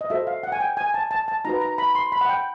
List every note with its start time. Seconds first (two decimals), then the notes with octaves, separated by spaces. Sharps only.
0.01 D#5
0.10 F#4 A4 C5 E5
0.27 F5
0.43 F#5
0.52 G#5
0.61 G5
0.77 G#5
0.94 A5
1.11 A5
1.28 A5
1.45 D#4 F#4 B4 A#5
1.61 A#5
1.78 B5
1.95 C6
2.12 B5
2.21 F#5
2.29 G5